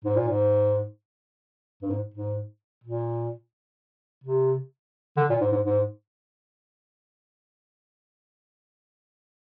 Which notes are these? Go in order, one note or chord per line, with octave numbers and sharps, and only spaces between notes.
G#2
A#2
G#2
G2
G#2
G#2
A#2
C3
D3
A#2
G#2
G#2
G#2